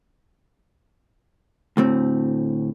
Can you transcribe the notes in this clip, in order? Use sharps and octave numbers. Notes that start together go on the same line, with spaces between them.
D2 A2 C4